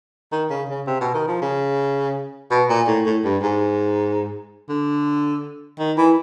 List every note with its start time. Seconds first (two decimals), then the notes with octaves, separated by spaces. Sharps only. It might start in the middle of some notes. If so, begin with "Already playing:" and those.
0.32 D#3
0.50 C#3
0.69 C#3
0.87 C3
1.01 B2
1.14 D#3
1.28 F3
1.42 C#3
2.51 B2
2.69 A#2
2.88 A2
3.06 A2
3.24 G2
3.42 G#2
4.69 D3
5.80 D#3
5.98 E3